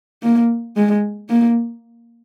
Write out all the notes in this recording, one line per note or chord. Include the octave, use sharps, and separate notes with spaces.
A#3
G#3
A#3